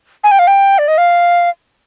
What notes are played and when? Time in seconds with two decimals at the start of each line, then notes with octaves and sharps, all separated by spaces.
0.24 G#5
0.31 G5
0.39 F5
0.47 G5
0.78 D5
0.88 D#5
0.98 F5